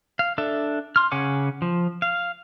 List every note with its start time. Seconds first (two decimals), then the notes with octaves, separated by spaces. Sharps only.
0.19 F5
0.38 D4 A4 E5
0.96 C6 F6
1.12 C#3 C#5 F#5 G#5 D6
1.62 F3
2.02 F5